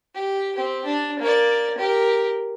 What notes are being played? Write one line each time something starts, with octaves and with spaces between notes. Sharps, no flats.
G4
C4 G4
D4
A#3 D5
G4 A#4